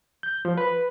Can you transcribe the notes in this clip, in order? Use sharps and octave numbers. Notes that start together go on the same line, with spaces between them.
G6
F3
B4